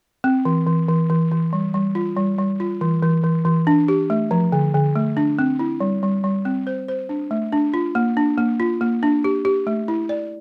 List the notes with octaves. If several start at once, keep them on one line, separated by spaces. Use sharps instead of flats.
C4
E3
E3
E3
E3
E3
G3
G3
F4
G3
G3
F4
E3
E3
E3
E3
D4
G4
A3
F3
D3
D3
A3
D4
C4
E4
G3
G3
G3
C4
C5
C5
D4
A3
D4
F4
A#3
D4
A#3
F4
A#3
D4
G4
G4
A3
E4
D5